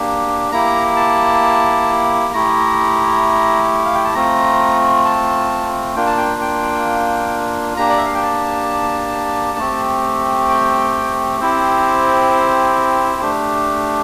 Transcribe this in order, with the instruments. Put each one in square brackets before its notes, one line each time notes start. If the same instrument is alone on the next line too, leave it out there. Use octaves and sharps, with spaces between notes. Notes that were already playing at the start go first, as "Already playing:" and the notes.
Already playing: [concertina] A#3 D4 G4
A#3 E4 G4 A#5
A5
A3 E4 G4 A#5
F5
G5
A5
A3 C4 F4 A#5
A5
A#3 D4 F4 G5
A5
G5
G5
A#3 D4 G4 A#5
D5
E5
F5
G5
A5
A3 C4 G4
G5
C4 E4 G4 C5
A3 D4 G4